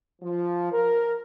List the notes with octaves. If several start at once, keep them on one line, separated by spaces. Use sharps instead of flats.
F3
A#4